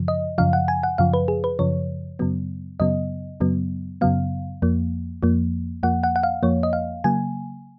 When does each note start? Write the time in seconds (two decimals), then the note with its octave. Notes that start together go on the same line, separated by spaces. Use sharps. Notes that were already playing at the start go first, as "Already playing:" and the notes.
Already playing: F#2 C#3 F3
0.08 D#5
0.38 F#2 C#3 F3 F5
0.53 F#5
0.68 G#5
0.83 F#5
0.98 F#2 C#3 F3 F5
1.14 B4
1.28 G#4
1.44 B4
1.59 F#2 C#3 F3 C#5
2.19 F#2 C#3 F#3 B3
2.80 F#2 C#3 F#3 B3 D#5
3.41 F#2 C#3 F#3 B3
4.01 F#2 C#3 F#3 B3 F5
4.62 F2 F3 A#3
5.23 F2 F3 A#3
5.83 F2 F3 A#3 F#5
6.04 F#5
6.16 F#5
6.23 F5
6.43 F2 F3 A#3 C#5
6.63 D#5
6.73 F5
7.04 C#3 F#3 A#3 G#5